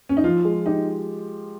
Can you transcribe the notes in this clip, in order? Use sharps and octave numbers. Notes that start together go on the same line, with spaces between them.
C#4
D#4
F3 F4
G#3
D#4 G4